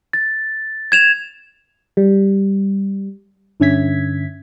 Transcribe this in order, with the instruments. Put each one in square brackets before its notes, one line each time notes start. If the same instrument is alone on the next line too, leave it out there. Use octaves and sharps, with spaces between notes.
[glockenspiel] A6
G#6 E7 F7
[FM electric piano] G3
G2 D3 C#4 E5 G#6 B6